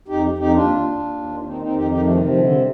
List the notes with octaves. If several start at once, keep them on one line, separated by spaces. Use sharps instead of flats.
F2 D#4 G4
F2
D#4 G4
D#2 D4 F4
D#2
D#2
D#3
D#3 C4 D#4
C4 D#4
F2
D#4 G4
D#3 D#4 G4
F3 A3
C3 G3
F3
D3 G3
G3